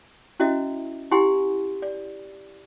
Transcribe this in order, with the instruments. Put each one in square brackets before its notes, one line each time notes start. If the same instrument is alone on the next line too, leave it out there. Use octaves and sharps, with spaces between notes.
[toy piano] C#4 E4 F#4 D#5 E5
E4 G4 F#5 G#5 C6
D5